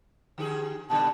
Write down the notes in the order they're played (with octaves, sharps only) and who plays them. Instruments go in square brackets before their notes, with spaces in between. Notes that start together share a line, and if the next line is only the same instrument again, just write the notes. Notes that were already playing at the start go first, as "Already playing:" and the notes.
[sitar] D3 G4 G#4
[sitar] A#2 D3 G3 [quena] A5